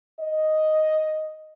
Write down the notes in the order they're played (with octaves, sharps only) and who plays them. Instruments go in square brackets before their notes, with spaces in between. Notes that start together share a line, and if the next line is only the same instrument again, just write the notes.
[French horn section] D#5